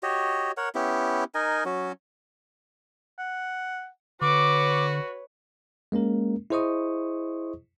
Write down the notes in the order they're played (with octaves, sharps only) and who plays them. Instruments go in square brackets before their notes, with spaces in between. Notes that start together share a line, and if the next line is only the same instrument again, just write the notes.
[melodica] F#4 G4 C#5 D#5
A#4 C#5 F#5
B3 C#4 E4 G4
D#4 A#4 D#5 G#5
F#3 C#4 F#4
[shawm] F#5
[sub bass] D3 [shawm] F#4 [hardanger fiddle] B4 C#5 [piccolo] D6
[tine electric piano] G#3 A#3 C#4 A#4
E4 G#4 C5 D#5 C#6 D#6